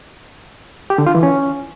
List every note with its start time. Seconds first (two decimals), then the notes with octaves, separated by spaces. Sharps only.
0.90 G4
0.98 D3
1.07 F4
1.15 E3
1.23 C#4